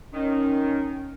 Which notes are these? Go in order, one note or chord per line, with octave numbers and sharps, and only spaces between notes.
D#3 C#4